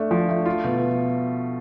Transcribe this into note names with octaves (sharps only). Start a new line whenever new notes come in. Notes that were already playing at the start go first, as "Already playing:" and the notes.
Already playing: A3 D4
F3
A3
F4
B2